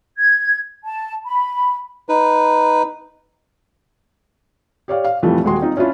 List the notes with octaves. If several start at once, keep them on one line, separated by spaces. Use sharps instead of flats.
G#6
A5
B5
D#4 B4
G4 C#5 D5 F5
F5
F2 A#2 E3 G3 A3
D#1 G#3 F#4 G#4 C6
C4 D#4 F4
C#4 D4 E4 F4 C#5